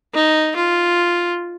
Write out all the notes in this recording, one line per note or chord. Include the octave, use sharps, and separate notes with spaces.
D#4
F4